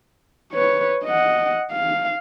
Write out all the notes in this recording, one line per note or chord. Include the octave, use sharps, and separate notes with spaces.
B4 C#5
D#5 F#5
F5